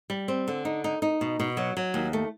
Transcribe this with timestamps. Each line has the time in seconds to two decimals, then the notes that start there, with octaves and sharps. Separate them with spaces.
0.10 G3
0.28 C4
0.48 D3
0.65 D#4
0.84 D#4
1.02 D#4
1.21 B2
1.40 B2
1.57 F#3
1.77 F#3
1.94 D#2
2.13 A3